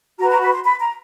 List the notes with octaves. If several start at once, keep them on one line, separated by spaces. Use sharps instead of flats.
F#4 B4 A#5
A#5
B5
C6
B5
A#5